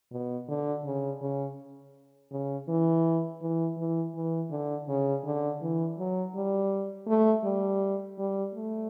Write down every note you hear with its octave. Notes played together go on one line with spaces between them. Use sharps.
B2
D3
C#3
C#3
C#3
E3
E3
E3
E3
D3
C#3
D3
E3
F#3
G3
A3
G3
G3
A3